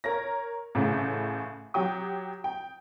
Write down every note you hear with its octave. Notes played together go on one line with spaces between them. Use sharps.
A#4 C#5 A#6
A1 A2 C#3
F#3 G4 G5 D#6
G5